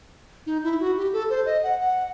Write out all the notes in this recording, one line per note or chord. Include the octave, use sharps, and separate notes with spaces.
D#4
E4
F#4
G4
A4
C5
D#5
F#5
F#5